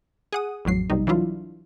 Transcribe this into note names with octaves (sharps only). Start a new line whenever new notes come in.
G#4 F#5 D#6
A1 F2 F#3 C7
B1 C3 G3 D#4
E3 F#3 D4 E4 F4